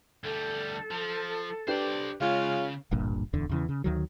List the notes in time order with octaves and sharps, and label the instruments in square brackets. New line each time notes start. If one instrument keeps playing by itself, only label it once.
[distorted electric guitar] D2 G3 [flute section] A4
[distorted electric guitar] F3
[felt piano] D4 G4 B4 [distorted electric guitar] C5 D5
[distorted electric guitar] C#3 [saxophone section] G#3 C#4 F4 [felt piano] F5
[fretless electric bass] D1 G1 G2 A#2
D1 E2 D3
E2 C#3 E3
C#3
D2 D#3 F#3